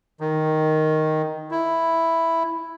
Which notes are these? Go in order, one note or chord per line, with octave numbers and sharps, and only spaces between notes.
D#3
E4